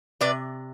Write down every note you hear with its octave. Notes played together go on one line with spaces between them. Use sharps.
C3 B4 D5